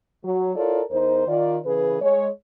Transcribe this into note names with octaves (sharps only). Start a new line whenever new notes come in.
F#3
E4 F4 A4 A#4 C#5 D5
E2 D#4 A#4 C5
D#3 F4 D5
C#3 E3 G#4 B4
G#3 C#5